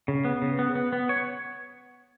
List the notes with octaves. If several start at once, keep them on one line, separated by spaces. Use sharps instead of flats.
C#3
B3
C#3
B3
B3
B3
C#5